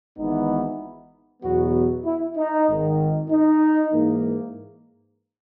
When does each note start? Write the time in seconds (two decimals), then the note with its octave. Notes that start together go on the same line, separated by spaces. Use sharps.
0.18 G#1 G#2 E3 B3 D#4
1.43 E2 B2 F#3 B3 F#4
2.05 E4
2.37 D#4
2.68 G#1 G#2 D#3
3.30 D#4
3.93 G#2 E3 A#3